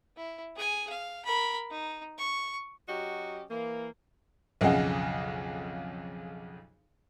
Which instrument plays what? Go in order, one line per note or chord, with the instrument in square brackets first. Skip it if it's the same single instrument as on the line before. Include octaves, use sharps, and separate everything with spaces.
[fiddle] E4
G#4 G#5
F5
A#4 B5
D#4
C#6
[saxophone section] F#3 C#4 F#4 G4 D#5
E3 A#3
[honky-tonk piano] B1 F2 C#3 G#4 D#5 F#5